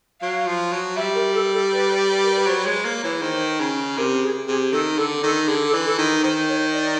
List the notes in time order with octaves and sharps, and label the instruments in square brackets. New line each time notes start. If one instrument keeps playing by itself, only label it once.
[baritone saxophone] F#3 [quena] F5
[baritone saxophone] F3
F#3
[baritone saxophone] G3 [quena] E5
[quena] A#4
A4
A4
B4
A#4
B4
[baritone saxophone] F#3 [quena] C5
[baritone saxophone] G#3 [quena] C#5
[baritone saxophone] A#3
[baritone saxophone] E3 [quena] C#5
[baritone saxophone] D#3 [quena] C5
[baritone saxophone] C#3
[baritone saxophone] C3 [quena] A#4
[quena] G#4
[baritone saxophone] C3 [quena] G#4
[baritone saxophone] D#3 [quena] A4
[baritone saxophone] D3 [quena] A4
[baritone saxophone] D#3 [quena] A4
[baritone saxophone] D3 [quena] G#4
[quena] A4
[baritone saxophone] E3
[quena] A4
[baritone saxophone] D#3
[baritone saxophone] D#3 [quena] C5
[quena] C#5
D5